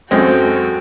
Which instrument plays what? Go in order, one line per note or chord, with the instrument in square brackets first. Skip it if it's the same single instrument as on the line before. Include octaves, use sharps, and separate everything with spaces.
[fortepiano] F#2 G#3 C4 [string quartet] F#4 A4 G5